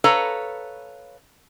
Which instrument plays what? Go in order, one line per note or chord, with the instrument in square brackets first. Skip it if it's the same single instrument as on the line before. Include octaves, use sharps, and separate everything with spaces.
[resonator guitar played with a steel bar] A4 B4 C#5 F5 A#5